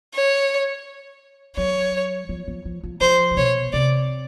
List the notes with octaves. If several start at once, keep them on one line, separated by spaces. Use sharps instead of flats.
C#5
F#3 C#5
F3
F3
F3
F3
F3 C5
C3
B2 C#5
C3 D5